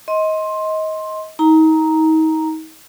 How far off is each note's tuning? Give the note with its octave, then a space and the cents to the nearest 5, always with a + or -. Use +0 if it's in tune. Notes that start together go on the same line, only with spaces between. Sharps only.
D#5 +20 C6 +10
D#4 +35 A#5 +0